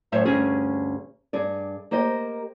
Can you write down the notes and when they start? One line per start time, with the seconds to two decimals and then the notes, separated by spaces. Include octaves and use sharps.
0.12 F#2 A2 C5 C#5 E5
0.25 D2 G2 C#4 G#4 G#5
1.33 G2 G#4 D5
1.91 A#3 G4 C5 D#5